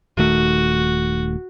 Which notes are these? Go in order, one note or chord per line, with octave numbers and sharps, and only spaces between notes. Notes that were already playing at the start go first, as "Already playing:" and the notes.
D#1 D#3 A3 F#4